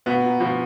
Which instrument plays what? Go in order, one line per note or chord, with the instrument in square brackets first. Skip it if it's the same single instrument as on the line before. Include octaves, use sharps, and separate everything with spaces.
[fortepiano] B2 [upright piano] B3
[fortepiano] A#2
[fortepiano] B2 [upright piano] F3